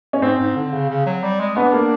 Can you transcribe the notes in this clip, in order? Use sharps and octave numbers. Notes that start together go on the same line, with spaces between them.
C#4
G#2 C4
G#2
D3
C#3
C#3
F#3
G3
G#3
B3 D4
A#3